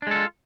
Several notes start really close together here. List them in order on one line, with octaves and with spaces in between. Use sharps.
D4 G#3 A4 F4